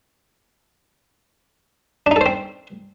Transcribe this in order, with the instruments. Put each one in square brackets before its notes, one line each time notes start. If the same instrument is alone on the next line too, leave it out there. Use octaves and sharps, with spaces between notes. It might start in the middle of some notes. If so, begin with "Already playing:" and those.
[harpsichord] D4
D#4
A4
C5
C4